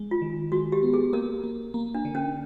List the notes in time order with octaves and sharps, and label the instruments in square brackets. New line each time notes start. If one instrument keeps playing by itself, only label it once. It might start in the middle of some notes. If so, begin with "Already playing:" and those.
Already playing: [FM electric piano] G#3
[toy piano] F4
[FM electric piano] D#3
[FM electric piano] G#3 [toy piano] F#4
[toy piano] G4
[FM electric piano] B3
[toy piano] G#4
[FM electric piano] A#3 [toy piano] A#4
[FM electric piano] A#3
A#3
[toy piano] D4
[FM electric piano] D3
[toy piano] C#4